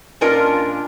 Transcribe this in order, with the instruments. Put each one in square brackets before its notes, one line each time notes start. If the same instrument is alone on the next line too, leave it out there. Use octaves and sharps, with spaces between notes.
[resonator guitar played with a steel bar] A#2 C#4 D4 F4 A#4 D#5